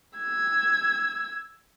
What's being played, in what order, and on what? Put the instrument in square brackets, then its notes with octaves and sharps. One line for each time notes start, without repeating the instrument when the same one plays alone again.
[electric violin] E6 G#6